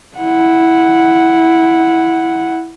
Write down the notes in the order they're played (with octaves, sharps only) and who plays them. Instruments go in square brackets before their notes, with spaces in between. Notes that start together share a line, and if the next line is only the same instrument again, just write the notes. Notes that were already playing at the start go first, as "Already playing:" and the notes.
[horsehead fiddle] E4 F#5